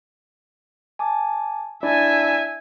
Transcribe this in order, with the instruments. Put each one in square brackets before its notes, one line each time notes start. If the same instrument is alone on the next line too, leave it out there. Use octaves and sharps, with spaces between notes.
[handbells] G#5 A5 D6
[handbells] D4 E4 D5 [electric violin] E5 G#5